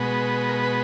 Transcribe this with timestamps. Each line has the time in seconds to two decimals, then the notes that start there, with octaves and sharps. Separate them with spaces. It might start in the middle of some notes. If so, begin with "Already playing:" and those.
Already playing: B2 G#3 B3
0.49 A#4
0.63 B4